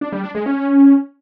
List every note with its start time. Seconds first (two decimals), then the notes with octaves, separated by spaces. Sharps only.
0.01 D4
0.12 G3
0.24 D4
0.35 G#3
0.46 C#4